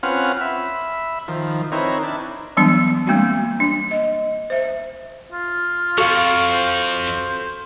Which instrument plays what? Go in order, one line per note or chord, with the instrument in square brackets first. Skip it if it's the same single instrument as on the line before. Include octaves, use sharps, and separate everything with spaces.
[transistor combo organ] C4 C#4 F4 B4 F#5 F6
E5 B5
D#3 F3
C4 D#4 E4 A#4 B4 C#5
D4 E4
[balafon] E3 F#3 G3 B3 D4
G3 G#3 A#3 C4 D4 F#4
D4
D#5
C5 E5
[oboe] F4
[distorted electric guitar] F2 [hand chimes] F#4 F5 [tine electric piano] A4 C#6 F6
[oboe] C5